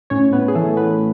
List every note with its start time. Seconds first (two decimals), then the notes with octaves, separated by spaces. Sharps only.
0.10 A2 C#4 C#5
0.33 A2 B3 B4
0.48 G#4
0.55 E3 A3 A4
0.77 A2 B3 B4